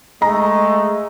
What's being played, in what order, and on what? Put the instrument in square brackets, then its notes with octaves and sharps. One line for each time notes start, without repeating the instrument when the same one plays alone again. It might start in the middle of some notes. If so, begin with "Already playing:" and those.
[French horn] G#3 [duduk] A3 [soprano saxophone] D#5 [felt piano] A#5